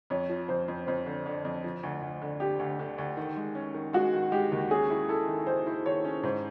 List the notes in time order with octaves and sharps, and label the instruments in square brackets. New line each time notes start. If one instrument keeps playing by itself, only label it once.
[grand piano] F2 [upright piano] C#5
[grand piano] F3
[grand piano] F2 [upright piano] C5
[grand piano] F2
[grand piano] F2 [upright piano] C5
[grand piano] D3
D3
F2
F3
D2
D2
D3
[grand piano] D3 [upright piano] G4
[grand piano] D2
D3
D2
D#3
G#3
C#4
D#3
[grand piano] G#3 [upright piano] F#4
[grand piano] D#3
[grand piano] G#3 [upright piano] G4
[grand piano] D#2
[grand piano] C#4 [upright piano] G#4
[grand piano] E4
[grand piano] E4 [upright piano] A4
[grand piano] D#3
[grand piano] D#3 [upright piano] C5
[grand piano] E4
[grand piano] D#3 [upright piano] C#5
[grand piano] C#4
[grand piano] G#2 [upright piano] C5